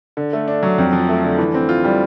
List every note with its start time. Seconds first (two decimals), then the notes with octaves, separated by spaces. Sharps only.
0.17 D3
0.33 A3
0.48 D4
0.63 F#3
0.78 F2
0.93 F3
1.09 A3
1.24 D3
1.38 E3
1.54 C4
1.69 F4
1.84 G3